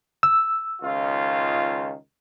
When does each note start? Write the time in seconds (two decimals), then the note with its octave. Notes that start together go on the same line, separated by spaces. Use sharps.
0.23 E6
0.82 C#2 D#3 F4